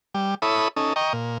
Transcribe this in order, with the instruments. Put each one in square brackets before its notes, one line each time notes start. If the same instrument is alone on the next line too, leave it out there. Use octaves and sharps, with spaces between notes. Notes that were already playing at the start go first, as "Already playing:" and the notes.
[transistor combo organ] G3
E4 A4 C#5 B5 D#6
C#4 D#4 A4
D#5 G5 A#5 C#6
A#2